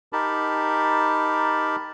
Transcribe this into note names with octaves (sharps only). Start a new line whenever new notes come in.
D#4 G4 A#4 A5 B5